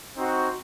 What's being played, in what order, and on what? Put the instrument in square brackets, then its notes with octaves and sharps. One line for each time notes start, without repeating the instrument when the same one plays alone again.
[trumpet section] C4 D#4 F#4